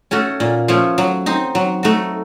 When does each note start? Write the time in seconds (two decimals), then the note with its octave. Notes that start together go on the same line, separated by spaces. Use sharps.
0.11 A3 C#4 F#4 A4
0.40 A#2
0.68 F3 A3 C#4
0.98 F#3
1.26 C4 D#4
1.55 F#3
1.83 A3 D#4 F#4